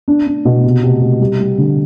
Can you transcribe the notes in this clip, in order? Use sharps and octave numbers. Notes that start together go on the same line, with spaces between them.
D4
D4
B2
C3
C3
C3
G3
G3
D3